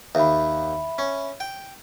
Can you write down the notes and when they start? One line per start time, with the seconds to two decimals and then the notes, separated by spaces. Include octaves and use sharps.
0.15 D#2 E5 B5
0.98 C#4
1.40 G5